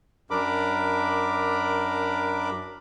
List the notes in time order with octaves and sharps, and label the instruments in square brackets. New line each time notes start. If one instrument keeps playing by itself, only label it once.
[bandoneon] F#2 D4 A#4 B5 D6